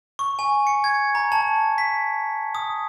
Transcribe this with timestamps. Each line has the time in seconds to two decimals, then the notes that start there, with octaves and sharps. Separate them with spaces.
0.19 C#6
0.39 G#5
0.67 C#7
0.84 G#6
1.15 A#5
1.32 A5
1.78 B6
2.55 D#6